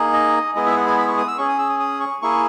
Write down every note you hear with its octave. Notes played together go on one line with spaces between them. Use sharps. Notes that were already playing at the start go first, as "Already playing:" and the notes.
Already playing: A#3 D#4 G#4
D#5
G#3 B3 E4 G#4 D#5
E5
F#5
G#5
B5
C#6
D#6
E6
C#4 G#4 C#6
D#6
E6
D#6
D#6
C#6
A#3 E4 G#4 C#6